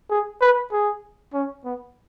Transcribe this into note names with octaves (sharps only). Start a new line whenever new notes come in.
G#4
B4
G#4
C#4
B3